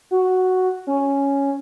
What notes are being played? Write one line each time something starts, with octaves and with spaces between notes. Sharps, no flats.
F#4
C#4